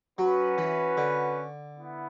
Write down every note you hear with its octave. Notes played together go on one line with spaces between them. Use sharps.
F#3 C#4 F#4 B4
E3
D3
B3 E4